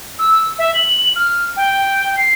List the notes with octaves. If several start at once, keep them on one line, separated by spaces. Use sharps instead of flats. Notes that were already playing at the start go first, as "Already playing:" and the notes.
E6
E5
F#7
F6
G5
C7